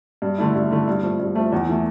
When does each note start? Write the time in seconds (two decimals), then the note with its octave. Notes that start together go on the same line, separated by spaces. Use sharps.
0.22 G2
0.38 D3 A3 E4
0.55 G2
0.71 D3 A3 E4
0.88 G2
1.03 F3 A3
1.19 G2
1.35 F3 A3
1.52 E2
1.69 E3 A3